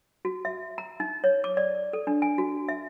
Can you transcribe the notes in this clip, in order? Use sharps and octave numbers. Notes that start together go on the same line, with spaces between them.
F#4
E5
A#5
D#4
C#5
D6
D5
A4
D4
G#5
F#4
E5